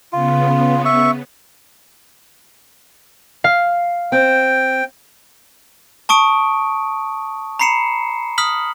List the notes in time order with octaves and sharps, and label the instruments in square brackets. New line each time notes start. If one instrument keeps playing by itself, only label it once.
[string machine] C#3 B3 [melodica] F4
[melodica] E5 C#6
[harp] F5
[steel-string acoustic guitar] C4 [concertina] G5
[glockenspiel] A5 C#6 D#6 D7
A#5 B5 C7 C#7 E7
D#6 F6 B6 F#7